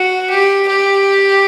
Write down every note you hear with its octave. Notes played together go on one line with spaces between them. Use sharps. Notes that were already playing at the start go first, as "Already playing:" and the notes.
Already playing: F#4
G4
G4